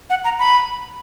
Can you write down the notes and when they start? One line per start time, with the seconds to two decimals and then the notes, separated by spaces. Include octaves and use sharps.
0.10 F#5
0.24 A#5
0.39 B5